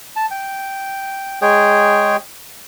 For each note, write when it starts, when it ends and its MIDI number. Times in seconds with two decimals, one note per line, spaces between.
0.16 0.26 81
0.31 1.39 79
1.41 2.16 56
1.41 2.16 68
1.41 2.16 73
1.41 2.16 79